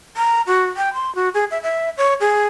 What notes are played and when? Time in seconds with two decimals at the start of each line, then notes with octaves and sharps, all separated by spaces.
0.17 A#5
0.47 F#4
0.77 G5
0.94 C6
1.15 F#4
1.34 G#4
1.51 E5
1.63 E5
1.98 C#5
2.20 G#4